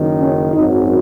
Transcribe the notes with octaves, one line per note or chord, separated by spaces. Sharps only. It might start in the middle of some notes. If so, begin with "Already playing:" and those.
Already playing: F#1 F#2 D#3
C#4
G#1 F#2 F#3 D#4